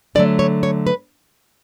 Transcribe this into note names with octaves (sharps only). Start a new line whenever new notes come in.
D3 F#3 A3 D5
C#5
C#5
B4